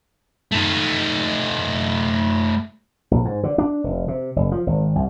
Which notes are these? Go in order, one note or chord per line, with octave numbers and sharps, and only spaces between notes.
A3 D#4
A#1
G#2
D3
D4
F1
C3
F#1
F3
G#1
C2